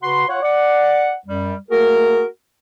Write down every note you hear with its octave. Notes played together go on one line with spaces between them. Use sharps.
C#3 F#4 B4 F#5 C6
F4 C#5 F#5
D5 F#5
F#2 G3
A3 A#3 F#4 G#4 A#4